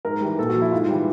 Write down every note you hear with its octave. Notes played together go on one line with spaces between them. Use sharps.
G#2 A#4
E3 G3
A#2 A4
F#4
F3
E4
G#2 F4
E3 G3